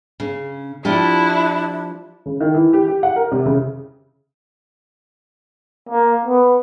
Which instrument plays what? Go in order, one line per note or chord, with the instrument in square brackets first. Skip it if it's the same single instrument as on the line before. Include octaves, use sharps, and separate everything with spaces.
[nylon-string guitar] C#3
[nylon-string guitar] F3 F4 G4 [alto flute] D4 [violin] E4
[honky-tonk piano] C#3
D#3
E3
G4
G4
F#5
A#4
C3
C#3
[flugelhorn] A#3
B3